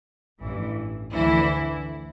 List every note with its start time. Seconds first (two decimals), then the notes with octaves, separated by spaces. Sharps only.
0.41 A1 G2 E3
1.12 D2 D3 E3 E4